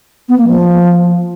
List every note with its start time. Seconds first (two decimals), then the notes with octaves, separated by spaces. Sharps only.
0.29 B3
0.38 A#3
0.47 F3